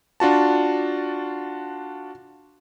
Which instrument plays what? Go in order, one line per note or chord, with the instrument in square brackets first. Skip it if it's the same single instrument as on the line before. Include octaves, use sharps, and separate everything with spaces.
[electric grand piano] D4 F4 F#4 A5